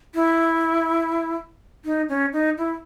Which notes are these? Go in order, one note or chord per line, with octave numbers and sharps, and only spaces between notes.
E4
D#4
C#4
D#4
E4